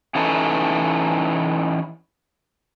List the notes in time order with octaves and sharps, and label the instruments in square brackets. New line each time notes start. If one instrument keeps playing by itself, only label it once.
[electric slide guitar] E3 C#4 D#4 A4 B4